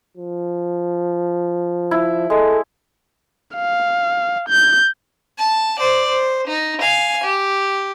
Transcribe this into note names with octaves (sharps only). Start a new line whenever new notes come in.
F3
E4
G#3 A4
F5
G6
A5
C5 D5
C5
D#4
F5 G#5
G4